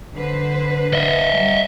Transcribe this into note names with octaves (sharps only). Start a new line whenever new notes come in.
D3 B4 C5
D#5 E5
G3